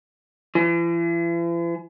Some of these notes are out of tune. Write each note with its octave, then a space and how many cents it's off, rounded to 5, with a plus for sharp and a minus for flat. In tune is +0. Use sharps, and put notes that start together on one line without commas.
E3 +45